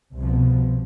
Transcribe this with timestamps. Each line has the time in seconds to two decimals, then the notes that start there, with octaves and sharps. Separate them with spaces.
0.15 C2 B2 F3